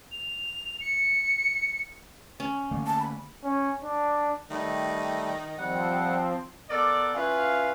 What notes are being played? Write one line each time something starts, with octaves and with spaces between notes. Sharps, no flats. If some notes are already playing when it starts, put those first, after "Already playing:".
F7
C#7
C#4
D3 A3 A#3
A5
B5
C#4
D4
D#3 G3 A3
F3 G3 C4 F#5
B3 A4 A#4 D5
C#4 E4 F4 B4 F5